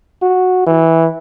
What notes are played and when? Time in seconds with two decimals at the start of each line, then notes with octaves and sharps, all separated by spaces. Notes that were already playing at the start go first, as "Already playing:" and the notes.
0.22 F#4
0.67 E3